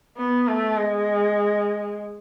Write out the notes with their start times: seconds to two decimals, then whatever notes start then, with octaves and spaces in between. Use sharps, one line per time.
0.18 B3
0.48 A3
0.77 G#3